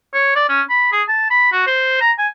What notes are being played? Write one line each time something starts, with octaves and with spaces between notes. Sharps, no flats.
C#5
D5
C#4
B5
G#4
A5
B5
F#4
C5
A#5
G#5